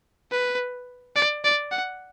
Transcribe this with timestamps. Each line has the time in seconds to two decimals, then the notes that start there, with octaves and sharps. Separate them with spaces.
0.31 B4
1.16 D5
1.44 D5
1.71 F#5